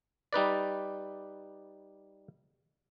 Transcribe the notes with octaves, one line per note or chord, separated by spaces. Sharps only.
G3 D#4 B4 D5